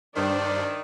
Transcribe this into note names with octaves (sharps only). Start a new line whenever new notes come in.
G2 D#3 D4 C5 D5